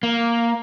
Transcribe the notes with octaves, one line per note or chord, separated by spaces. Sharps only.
A#3